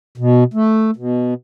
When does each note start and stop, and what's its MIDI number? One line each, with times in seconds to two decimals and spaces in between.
0.18 0.44 47
0.54 0.91 57
0.97 1.34 47